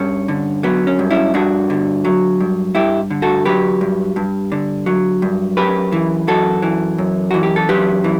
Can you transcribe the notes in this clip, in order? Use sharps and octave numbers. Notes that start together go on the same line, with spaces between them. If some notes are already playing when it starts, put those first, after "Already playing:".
Already playing: G2 C#4
D3
F#3 B3
C#4
G2
C#4 E4
G2 D4 F#4
D3
F#3
G2
G2 E4 G4
D3
F#4 A4
F#3 G4 B4
G2
G2
D3
F#3
G2
F#2 G4 B4
E3
F#2 F#4 A4
E3
F#2
E3 F#4
G4
A4
F#2 G4 B4
E3